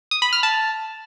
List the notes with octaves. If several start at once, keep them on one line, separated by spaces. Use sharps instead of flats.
D#6
B5
F6
A5